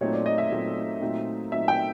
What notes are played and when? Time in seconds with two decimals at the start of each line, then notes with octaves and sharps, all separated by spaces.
0.01 A#2 F#3 A3 C4 D#4 C#5
0.13 D5
0.26 D#5
0.38 E5
0.52 A#2 F#3 A3 C4 D#4
1.01 A#2 F#3 A3 C4 D#4
1.52 A#2 F#3 A3 C4 D#4 E5
1.68 G5